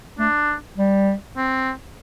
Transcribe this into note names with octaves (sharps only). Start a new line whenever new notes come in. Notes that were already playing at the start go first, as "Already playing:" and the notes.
A3 D4
G3
C4